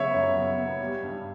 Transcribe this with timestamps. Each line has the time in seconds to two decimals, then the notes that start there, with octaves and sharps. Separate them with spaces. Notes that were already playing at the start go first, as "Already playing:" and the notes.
Already playing: C#3 F#3 B3 C#5 E5
0.14 F#2
0.36 F#3
0.58 B3
0.80 G3
1.03 G2